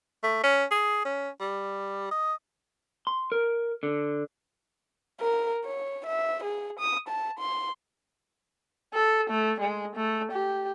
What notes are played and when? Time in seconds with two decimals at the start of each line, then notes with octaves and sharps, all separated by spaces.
0.24 A3
0.44 C#4
0.71 G#4
1.05 C#4
1.40 G3
2.11 D#5
3.07 C6
3.32 A#4
3.83 D3
5.21 A#4
5.65 C#5
6.06 E5
6.44 G#4
6.80 D#6
7.09 A5
7.39 C6
8.94 A4
9.30 A3
9.61 G#3
9.96 A3
10.32 G4